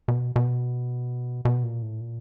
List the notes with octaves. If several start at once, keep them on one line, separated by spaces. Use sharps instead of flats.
B2
B2
B2
A#2
A2
A#2